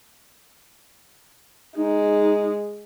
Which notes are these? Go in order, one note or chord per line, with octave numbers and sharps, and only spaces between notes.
G#3 D#4